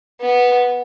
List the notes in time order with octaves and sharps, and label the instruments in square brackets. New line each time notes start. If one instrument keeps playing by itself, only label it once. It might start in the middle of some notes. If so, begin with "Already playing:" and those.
[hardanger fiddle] B3